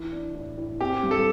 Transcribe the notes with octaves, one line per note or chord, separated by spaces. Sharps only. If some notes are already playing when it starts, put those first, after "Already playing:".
Already playing: E3 E4
D4
A2
A2
C4 G4
G2
A4